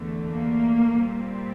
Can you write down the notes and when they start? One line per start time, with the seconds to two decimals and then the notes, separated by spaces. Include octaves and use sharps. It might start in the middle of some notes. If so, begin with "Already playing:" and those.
Already playing: E2 D3 A3
0.31 A#3
1.03 A#2 G3 C4